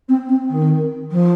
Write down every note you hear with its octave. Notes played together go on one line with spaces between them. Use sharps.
C4
C4
D#3
F3